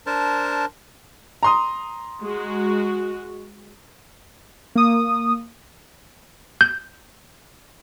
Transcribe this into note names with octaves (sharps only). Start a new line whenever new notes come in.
D4 A#4 C5 A5
A#5 C6 D#6
G#3 F#4
A#3 D#6
G6